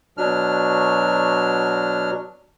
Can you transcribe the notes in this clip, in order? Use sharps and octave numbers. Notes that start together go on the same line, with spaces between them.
B2 F#3 D4 F6